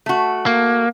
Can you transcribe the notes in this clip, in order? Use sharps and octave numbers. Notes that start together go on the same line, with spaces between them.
A3 F#4
A#3